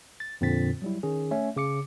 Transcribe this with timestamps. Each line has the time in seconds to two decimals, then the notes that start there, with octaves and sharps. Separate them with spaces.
0.20 A6
0.41 F2 A#2 D3 C4 A6 B6
0.82 F#3 G3 E4
1.03 D#3 C#4 G#4
1.31 A3 C#4 C#5 E5
1.56 C#3 D6 C#7